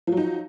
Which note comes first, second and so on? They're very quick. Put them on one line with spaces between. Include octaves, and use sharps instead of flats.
F3 F#3 D#4